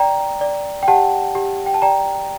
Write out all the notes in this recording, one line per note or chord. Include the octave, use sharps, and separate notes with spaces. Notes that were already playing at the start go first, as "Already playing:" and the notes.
Already playing: D5 G5 A#5
D5
G5
G4 F#5 A5
G4
G5
A5
D5 G5 A#5